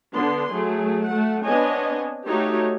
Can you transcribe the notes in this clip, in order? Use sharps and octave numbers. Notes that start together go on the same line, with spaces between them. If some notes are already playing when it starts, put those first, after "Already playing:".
D3 B3 D4 C6
F#3 A3 G#4
A3 F#5
B3 C4 D4 C#5 D#5 G#5
A3 D#4 F#4 G4 C#5